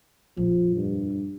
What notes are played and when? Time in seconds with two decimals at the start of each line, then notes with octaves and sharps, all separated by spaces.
0.37 A#1 F2 F3
0.77 G2